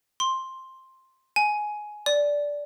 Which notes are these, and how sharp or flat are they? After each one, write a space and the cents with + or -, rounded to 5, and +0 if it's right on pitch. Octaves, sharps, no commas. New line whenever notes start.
C6 +10
G#5 +10
D5 -10